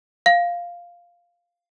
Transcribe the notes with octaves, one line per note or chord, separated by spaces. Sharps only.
F5